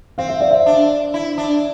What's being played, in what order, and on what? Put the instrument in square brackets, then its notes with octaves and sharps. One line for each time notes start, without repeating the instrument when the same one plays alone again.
[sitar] C4 [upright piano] F5
[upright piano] E5
D5
E5
[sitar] D4
E4
D4